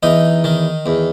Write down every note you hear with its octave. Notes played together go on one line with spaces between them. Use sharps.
E2 D#4
D#3
E2